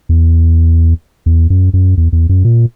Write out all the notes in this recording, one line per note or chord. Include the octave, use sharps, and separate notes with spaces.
E2
E2
F#2
F#2
E2
E2
F#2
A#2